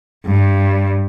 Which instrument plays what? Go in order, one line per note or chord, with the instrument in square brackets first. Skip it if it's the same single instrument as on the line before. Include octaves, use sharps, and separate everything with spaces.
[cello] G2